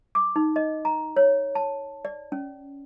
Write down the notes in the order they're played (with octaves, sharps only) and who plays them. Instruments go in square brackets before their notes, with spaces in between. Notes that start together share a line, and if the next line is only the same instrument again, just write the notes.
[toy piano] D6
D#4
D#5
A#5
C#5
A5
D5
C#4